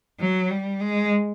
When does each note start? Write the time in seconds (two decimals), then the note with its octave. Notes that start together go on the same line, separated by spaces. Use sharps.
0.20 F#3
0.50 G3
0.80 G#3